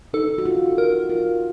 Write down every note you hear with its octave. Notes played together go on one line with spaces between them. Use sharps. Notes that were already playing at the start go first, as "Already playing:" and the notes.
D#4 A4
F#4
F4
F#4 A#4
F4